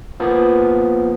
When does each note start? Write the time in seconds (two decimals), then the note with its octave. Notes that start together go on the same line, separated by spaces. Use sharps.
0.20 F3 A#3 B3